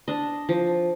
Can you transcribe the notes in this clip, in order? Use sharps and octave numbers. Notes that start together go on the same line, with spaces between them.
D4 D#5
F3